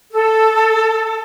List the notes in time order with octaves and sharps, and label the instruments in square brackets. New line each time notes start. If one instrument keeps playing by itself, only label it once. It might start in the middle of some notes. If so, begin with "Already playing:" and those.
[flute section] A4